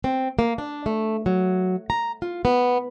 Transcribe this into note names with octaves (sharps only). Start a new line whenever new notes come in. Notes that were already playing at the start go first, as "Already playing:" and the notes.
C4
A#3
D4
A3
F#3
A#5
F4
B3